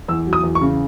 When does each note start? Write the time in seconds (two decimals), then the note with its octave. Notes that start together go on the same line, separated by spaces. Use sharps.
0.08 E2 E6
0.27 F#3
0.33 D#6
0.43 E2
0.55 C#6
0.61 C#3